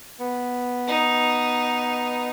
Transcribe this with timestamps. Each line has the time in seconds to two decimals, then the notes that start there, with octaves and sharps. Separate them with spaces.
0.19 B3
0.87 D#4